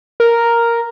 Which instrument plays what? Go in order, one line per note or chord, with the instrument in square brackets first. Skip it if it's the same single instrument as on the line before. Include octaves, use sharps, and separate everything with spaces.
[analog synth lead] A#4